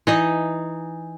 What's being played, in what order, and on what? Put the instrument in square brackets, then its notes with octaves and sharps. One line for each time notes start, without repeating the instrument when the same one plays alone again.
[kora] E3 D#4 D#5